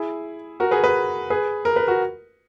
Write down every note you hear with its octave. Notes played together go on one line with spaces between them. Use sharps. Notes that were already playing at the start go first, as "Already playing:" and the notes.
Already playing: E4 G#4
F#4 A#4
G#4 B4
G#4 B4
G#4 B4
A#4
B4
F#4 A#4